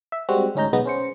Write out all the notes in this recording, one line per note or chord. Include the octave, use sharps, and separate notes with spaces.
E5
G3 G#3 C4 F#4
D2 G#2 C#4 D#4 A#5 G6
B1 G#3 B3 D#4 A#6
C#4 C5 C#7